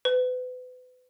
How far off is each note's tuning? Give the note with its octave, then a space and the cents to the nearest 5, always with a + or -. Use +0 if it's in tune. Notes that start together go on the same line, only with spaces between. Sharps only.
B4 +35